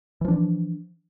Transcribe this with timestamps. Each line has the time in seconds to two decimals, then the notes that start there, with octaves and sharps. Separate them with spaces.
0.21 E3
0.25 F3
0.28 D4